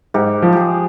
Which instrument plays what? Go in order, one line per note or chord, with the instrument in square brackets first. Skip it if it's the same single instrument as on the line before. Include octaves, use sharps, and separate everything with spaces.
[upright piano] G#2 [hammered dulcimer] G4
[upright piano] F3
[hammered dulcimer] G4 G#4